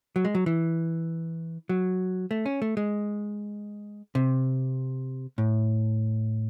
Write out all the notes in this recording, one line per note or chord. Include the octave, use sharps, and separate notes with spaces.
F#3
G#3
F#3
E3
F#3
A3
C#4
A3
G#3
C3
A2